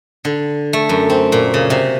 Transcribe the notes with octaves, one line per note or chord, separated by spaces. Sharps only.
D3
A3
F#2
C4
A#2
C#3
C3